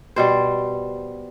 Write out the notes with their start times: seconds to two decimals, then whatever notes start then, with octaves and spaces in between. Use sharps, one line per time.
0.16 B2 G3 C5